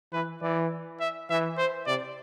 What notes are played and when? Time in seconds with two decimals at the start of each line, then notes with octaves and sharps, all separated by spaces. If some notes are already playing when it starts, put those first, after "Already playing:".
0.13 E3 B4
0.41 E3 D5
1.00 E5
1.30 E3 E5
1.58 C5
1.87 C3 D5